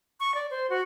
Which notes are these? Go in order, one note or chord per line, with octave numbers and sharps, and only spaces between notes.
C#6
D5
C5
F#4